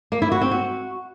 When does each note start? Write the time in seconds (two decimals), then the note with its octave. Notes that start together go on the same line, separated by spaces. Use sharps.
0.12 A#3
0.22 E4
0.32 F#4
0.41 C4
0.51 F#4